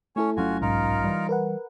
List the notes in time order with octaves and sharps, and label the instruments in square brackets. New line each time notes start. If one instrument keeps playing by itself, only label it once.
[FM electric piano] A3 E4 A4 [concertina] C#4 C#5
[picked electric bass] G1 F#3 C#4 [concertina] F4 F#4 G#5
[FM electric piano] B1 G#2 [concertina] D#4 F4 A#4
[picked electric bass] E3 G3
[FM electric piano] A#4 B4 F#5